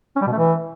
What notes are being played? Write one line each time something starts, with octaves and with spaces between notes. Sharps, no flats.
C#4
G3
B2
A3
E3